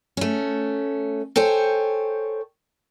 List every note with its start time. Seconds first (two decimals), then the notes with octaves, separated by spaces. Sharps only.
0.17 A3 C#4
1.36 A4 C5 C#5 G5 G#5